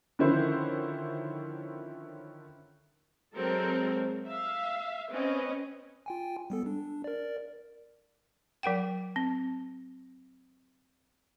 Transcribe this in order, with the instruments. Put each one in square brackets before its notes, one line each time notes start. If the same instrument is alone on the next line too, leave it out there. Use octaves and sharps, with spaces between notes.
[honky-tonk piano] D3 D#3 F3 C#4 E4 C5
[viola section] F#3 G#3 C4 A4 A#4
E5 F5
C4 C#4 B4 D#5
[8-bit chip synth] F4 G5 G#5
G3 B3 A4
D4
A#4 D5
[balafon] F#3 A#4 F#5 G5
C4